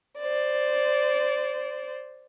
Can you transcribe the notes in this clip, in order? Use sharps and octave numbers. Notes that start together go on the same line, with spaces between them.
C5 D5